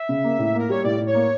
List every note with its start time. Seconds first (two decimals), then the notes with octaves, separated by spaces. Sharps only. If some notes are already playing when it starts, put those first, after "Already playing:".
Already playing: E5
0.09 C#3
0.24 A#3
0.38 A2
0.55 A#3 A#4
0.69 G3 C#5
0.84 A2 D5
1.00 A2
1.07 C#5
1.14 A#3